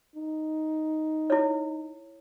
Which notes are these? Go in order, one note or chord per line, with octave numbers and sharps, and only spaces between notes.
D#4
E4 C#5